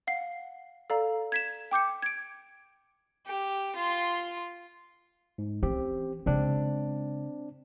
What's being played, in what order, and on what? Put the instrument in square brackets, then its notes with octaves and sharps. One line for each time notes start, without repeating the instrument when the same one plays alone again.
[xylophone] F5 F#5 C7
A4 D5 F5 A#5
G#6 B6 E7
G5 D6 G6 C#7
G#6 D7
[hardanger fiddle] G4
F4 C6
[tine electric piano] G#2
[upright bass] E3 C#4 [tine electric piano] C4 G4
[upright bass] C#3 G#3 [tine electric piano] C4 D4